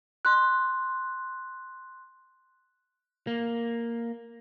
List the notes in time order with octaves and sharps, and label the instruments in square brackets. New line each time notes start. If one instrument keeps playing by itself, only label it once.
[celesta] C6 F#6
[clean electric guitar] A#3